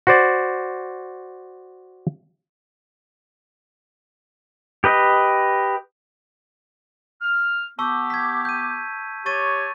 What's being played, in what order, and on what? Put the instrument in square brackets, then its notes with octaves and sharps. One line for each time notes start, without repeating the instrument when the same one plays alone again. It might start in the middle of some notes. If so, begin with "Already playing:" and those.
[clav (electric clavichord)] F#4 C5 D5
[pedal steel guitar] G4 B4 D#5
[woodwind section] F6
[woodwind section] B3 G4 [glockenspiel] A5 C#6 E6
[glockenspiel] G#6 B6
G6 D#7
[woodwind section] G4 C#5 [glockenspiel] C#6 A6 D#7